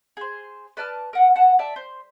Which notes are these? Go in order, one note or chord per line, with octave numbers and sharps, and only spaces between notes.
G#4 C5
B4 D5 A5 F6
A#4 F#5
F#5 A5
D5 E5 A5
C5